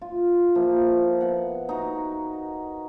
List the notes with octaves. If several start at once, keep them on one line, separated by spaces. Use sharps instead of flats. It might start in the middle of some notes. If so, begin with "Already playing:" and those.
F4
F3 A#3 E4
B3 F#5
D#4 F#4 A#5